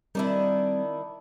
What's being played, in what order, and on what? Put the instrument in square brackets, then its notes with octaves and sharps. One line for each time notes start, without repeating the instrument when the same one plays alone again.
[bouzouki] D#3 D4 E4 [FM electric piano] G3 C4